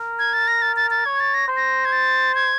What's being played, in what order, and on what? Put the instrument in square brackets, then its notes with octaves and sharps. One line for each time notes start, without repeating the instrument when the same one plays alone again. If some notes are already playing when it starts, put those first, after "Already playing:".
Already playing: [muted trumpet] A#4
[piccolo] G#6
A6
A#6
A6
A6
A6
[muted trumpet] C#5 [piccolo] G#6
[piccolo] A6
A#6
[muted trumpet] C5
[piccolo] A#6
G#6
A6
G#6